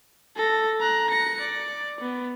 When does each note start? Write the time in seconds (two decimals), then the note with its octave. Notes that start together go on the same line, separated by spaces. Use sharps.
0.36 A4 A#6
0.80 A#5 F#6
1.10 A#6 C#7
1.40 D5
2.01 B3